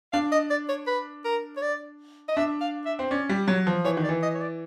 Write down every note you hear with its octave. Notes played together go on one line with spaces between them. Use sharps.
D4 F5
D#5
D5
C#5
B4
A#4
C#5
D5
D#5
D4 E5
F5
E5
C4
C#4 D5
G3
F#3 C#5
F3
E3 C#5
D#3
D5
E3
D#5
C#5
D5